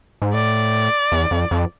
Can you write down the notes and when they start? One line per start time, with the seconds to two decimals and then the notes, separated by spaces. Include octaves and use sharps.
0.22 G#2
0.33 A2 D5
1.12 E2
1.31 F2
1.51 F2